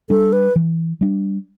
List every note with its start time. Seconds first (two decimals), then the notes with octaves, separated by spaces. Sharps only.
0.10 G3 D4 A4
0.33 B4
0.56 E3
1.01 G3 D4